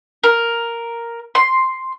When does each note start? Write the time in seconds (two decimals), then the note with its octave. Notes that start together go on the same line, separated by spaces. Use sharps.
0.24 A#4
1.35 C6